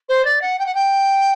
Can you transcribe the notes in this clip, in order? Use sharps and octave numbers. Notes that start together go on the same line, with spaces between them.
C5
D5
F#5
G5
F#5
G5